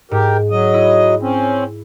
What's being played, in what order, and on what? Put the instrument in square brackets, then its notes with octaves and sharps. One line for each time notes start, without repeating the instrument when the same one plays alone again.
[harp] G#2 [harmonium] G4 A#4
[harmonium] F#3 D#5
[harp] E4
[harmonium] C4 C#4